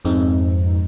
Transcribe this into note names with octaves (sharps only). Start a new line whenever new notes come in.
F2 G#2 G#3 C4 D#4